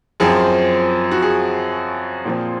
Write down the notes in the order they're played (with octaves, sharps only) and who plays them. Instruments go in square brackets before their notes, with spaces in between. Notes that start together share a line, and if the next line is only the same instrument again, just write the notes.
[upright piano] F#2 F3 C4 G#4
F#4
G#4
A#2 F3 C4